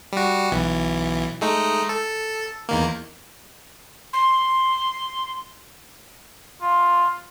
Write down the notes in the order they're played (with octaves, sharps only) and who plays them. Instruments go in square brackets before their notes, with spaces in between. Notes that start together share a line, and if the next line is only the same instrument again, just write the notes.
[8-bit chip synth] G3 F#4
B1 E3
G#3 A3 D#4
A4
E2 D#3 A#3
[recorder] C6
[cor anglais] F4